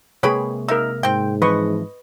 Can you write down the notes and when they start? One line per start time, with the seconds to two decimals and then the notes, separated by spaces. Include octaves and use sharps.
0.23 C3 G#3 A#3 G#4 B4 C#5 G5 B5
0.68 D#4 A#4 E5 E6
1.03 G#2 C4 G5
1.42 E3 F3 C4 B4 D#5 C6 C#6